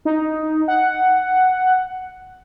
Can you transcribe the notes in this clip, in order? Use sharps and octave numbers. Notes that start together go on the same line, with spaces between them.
D#4
F#5